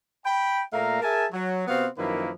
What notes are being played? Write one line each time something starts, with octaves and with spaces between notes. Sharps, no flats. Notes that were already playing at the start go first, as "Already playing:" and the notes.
G5 B5
A#2 A3 A#3 F5 A#5
G#4 A#4 E5 G#5 A5
F#3
C3 B3 C4 F#4 C5 F5
F#2 D#3 F3 A#3 E4 B4